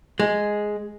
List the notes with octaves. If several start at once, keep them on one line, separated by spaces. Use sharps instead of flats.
G#3